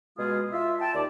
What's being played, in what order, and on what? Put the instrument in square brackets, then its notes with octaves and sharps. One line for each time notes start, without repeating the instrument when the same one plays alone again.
[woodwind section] B2 G#3 F4 G#4 D#6
F4 E5
G5 A5
D#2 D#4 D5